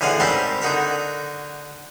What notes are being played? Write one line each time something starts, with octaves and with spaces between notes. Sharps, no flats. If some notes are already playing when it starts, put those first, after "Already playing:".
A1 D3 G#4 D#5 F5 F#5
G#2 G3 C4 A#4 A5 C6
D3 D#4 F#4 A#4